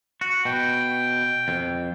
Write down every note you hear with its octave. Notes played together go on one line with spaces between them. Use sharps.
F#4
B2 G5
F2